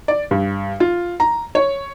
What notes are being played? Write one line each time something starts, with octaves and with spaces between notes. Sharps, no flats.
D5
G2
F4
A#5
C#5